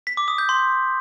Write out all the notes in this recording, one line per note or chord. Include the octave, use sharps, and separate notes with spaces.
B6
D6
D#6
G6
C6